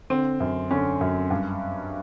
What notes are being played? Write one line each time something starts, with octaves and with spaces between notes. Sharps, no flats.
D3 C4
F#2
D3 C#4
F#2
G2